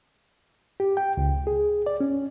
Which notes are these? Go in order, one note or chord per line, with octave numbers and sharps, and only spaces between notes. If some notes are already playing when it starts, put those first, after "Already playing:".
G4
G5
C#2
G#4
D5
C#4